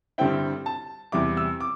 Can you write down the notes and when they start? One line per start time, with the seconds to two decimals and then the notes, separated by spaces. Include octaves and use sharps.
0.18 G2 D3 G3 C4 E4 G5
0.66 A5
1.12 E2 C3 G3 E4 D6
1.37 E6
1.61 D6